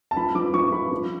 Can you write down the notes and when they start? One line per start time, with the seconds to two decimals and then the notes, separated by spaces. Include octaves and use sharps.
0.11 A5
0.16 F3 B5
0.35 F3 D6
0.54 F3 C#6
0.72 F3 B5
0.92 F3